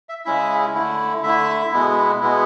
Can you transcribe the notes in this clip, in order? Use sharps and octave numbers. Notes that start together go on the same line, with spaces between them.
E5
C#3 G#3 C#4 E4 E5
D3 A3 E4
D3 A3 E4 E5
B2 G#3 B3 E4
B2 G#3 B3 E4